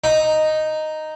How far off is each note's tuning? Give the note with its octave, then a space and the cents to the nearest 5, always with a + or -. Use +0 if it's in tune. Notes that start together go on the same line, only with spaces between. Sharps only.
D#4 -5